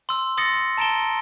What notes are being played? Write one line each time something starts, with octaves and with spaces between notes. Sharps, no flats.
C6 E6
C6 D#6 A6 A#6 C#7
A5 A#5 A6 D7 E7 G7